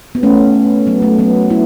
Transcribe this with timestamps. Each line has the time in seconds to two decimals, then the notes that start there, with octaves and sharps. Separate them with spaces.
0.15 B3
0.23 A3 C#4
0.87 F#3 B3
1.02 A3
1.18 F#3 B3
1.50 B3 E4